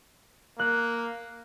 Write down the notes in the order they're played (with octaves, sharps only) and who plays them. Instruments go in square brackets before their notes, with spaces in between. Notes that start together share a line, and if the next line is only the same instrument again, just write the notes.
[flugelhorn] A#3 [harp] F#6